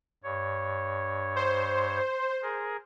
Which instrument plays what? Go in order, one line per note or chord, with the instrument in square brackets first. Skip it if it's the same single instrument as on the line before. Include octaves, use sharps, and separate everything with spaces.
[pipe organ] G2 C#5
[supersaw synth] C5
[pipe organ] G#4 A#4